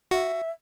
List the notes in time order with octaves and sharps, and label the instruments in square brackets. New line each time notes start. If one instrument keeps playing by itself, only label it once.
[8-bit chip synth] F#4 [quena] E5